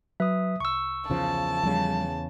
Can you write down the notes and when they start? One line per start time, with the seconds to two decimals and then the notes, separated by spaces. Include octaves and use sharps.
0.20 F#3 B4 E5 D#6 F#6
0.60 C2 C#6 E6
1.10 E2 C#3 F3 A5
1.63 E2 C#3 F3 G3